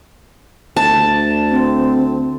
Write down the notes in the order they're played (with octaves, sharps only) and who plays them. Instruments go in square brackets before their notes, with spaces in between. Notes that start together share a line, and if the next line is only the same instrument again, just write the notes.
[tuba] D2 [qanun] A5
[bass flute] C4